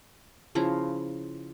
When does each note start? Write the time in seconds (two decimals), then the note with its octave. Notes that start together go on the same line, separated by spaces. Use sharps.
0.55 C#3 F3 E4 A#5